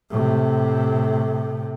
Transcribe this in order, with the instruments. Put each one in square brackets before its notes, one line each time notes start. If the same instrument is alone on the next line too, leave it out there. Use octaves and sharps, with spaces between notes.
[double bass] A2 C3